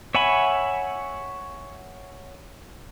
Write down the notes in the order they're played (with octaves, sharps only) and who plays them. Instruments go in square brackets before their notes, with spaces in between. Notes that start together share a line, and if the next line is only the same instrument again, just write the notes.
[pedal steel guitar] C#5 E5 F#5 G#5 B5